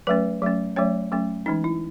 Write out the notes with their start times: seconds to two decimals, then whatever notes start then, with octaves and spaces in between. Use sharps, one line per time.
0.07 F#3 A3 C#4 B4
0.42 F#3 A3 C#4
0.76 F#3 A3 C#4 C#5
1.12 F#3 A3 C#4
1.46 E3 G#3 C#4 D#4
1.64 E4